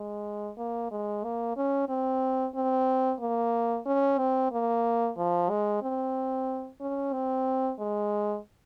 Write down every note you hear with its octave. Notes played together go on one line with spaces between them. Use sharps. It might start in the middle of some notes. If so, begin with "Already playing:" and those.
Already playing: G#3
A#3
G#3
A#3
C#4
C4
C4
A#3
C#4
C4
A#3
F3
G#3
C4
C#4
C4
G#3